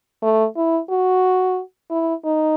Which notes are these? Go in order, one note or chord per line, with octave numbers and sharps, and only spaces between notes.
A3
E4
F#4
E4
D#4